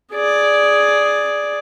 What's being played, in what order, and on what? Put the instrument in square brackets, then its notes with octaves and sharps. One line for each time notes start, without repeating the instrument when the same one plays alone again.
[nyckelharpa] G#4 D5